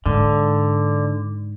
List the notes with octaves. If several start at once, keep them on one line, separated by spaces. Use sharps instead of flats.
G#2 D3